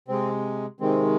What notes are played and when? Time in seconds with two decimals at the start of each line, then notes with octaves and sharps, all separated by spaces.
0.08 C3 G#3 C4
0.80 C3 D#3 G#3 C4